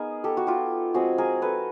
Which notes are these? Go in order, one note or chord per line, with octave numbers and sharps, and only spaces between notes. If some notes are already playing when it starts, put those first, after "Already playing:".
Already playing: B3 D#4 G#4 A#4
G4 A4
F#4
F4 G4
F3 G#3 C4 F#4 G#4
G#4 A#4
A4 B4